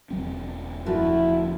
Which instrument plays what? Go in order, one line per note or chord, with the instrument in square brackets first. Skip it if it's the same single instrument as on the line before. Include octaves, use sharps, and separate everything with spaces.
[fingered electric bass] E1 F#3 C4
[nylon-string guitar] F3 A3 F#4 [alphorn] E4